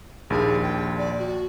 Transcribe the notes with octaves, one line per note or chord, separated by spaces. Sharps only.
A#1 D#2 G#4
G5
D5
F#4